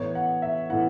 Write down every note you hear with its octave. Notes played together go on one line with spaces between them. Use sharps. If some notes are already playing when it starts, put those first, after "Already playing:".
Already playing: A2 E3 B3 E4 C#5
F#5
E5
A2 E3 B3 E4 F#5